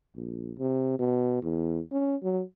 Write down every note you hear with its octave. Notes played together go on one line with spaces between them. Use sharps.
A#1
C3
B2
E2
C#4
F#3